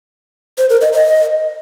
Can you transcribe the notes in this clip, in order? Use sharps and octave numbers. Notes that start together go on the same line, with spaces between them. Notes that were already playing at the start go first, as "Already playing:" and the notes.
C5
A#4
D#5
D#5